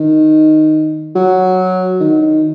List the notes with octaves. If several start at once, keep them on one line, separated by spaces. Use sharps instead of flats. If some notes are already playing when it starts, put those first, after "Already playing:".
Already playing: D#3
F#3
D#3
D#3